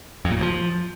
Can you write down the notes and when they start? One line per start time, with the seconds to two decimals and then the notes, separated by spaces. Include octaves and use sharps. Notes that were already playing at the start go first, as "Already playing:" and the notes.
0.25 F2
0.31 A#2
0.37 A2
0.42 F3